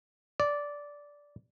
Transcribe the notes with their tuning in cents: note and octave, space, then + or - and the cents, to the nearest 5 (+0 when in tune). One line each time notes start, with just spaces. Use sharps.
D5 -10